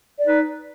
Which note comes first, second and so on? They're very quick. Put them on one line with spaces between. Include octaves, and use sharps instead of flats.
D5 D#4 B4